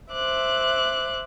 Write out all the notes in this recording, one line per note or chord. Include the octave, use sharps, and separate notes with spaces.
C5 E5 D6 F#6